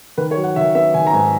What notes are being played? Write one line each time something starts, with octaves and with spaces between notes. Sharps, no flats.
D#3 B4
C#5
F#3
F#5
D#3 E5
B3 E5
D#3 G#5
A#5
G#2 G#5